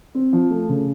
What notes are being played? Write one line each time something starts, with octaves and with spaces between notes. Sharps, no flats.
C4
F3
A3
C#3